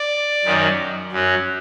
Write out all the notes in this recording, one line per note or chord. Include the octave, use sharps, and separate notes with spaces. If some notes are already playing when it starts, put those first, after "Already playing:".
Already playing: D5
F#2 D#3 F#3
F#2 F#3